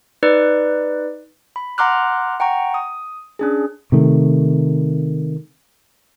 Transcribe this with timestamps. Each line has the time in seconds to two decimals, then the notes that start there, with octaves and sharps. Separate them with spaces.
0.23 D#4 B4 D5
1.56 B5
1.78 F#5 A#5 C6 D6 F6 F#6
2.40 F#5 G5 A#5 C#6
2.74 D#6
3.39 C#4 D4 G#4
3.92 C3 D#3 A3